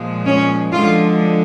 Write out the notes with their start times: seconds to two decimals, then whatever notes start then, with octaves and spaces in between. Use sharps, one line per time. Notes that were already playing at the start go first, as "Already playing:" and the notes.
Already playing: A#2 F3 G#3
0.25 C#4
0.71 D3 F3 G#3 F4